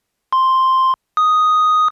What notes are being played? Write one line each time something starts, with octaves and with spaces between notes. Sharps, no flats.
C6
D#6